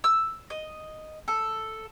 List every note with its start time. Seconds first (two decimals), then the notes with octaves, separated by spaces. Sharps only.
0.04 E6
0.50 D#5
1.28 A4